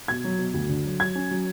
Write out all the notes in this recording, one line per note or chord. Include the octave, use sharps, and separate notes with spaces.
B2 G#6
F#3
B2
D2
D3
F#3
F#3 G#6
C#4
F#3